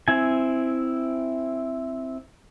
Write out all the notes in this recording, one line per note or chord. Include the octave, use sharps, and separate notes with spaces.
C4 E4 G#5